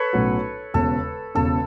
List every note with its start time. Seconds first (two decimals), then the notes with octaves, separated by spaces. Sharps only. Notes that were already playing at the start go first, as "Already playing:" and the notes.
Already playing: A4 B4 C#5
0.13 B1 A2 F#3 C#4 F#4
0.74 E1 E2 C#3 A4
1.35 E1 E2 C#3 A4